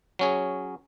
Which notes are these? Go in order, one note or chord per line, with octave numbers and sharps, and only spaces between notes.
F#3 C#4 G#4